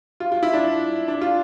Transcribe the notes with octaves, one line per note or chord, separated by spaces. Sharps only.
F4
F4
E4
D4
D4
F4